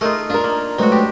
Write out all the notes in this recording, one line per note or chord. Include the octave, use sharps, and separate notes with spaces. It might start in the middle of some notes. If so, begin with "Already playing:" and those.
A3 D#4 F4 G#4 A#4
D4 D#4 F4 A#4
A#3
F#3 G#3 A3 C4 D#4 F#4 B4
D4 G4